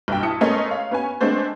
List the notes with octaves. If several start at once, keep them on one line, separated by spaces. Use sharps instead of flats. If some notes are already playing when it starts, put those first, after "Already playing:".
B1 G2 G5
E4 A5 D#6 C#7
G#3 A3 B3 C#4 A#4 D#5
C#5 F5
B3 C#4 B4 G#5
G#3 A3 B3 C4 D4 C5